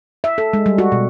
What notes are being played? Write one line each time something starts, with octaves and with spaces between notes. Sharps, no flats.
E5
A4
G#3
G3
F#4
B2